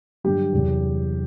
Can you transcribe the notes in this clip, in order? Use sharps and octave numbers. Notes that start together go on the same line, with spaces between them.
G2 D3 F#3 G4
E2 C3 F#3